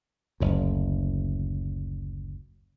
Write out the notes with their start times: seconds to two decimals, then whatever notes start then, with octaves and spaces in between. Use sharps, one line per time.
0.40 F#1 D2